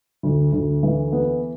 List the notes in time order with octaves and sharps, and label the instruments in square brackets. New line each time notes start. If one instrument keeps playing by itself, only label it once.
[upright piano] D2
D2
E3
B3